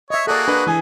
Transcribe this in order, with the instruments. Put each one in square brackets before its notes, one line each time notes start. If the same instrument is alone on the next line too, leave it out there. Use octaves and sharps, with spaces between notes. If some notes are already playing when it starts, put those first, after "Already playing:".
[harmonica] C#5 [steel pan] D#5 E5
[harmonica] A#3 F#4 G#4 [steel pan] A4 D5
[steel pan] D4 [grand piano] B4
[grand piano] E3 G#5 [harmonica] G#4